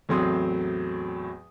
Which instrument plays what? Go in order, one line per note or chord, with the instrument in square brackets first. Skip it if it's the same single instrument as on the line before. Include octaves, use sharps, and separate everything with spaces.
[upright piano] E2 A2 F#3 C4 C6 D#6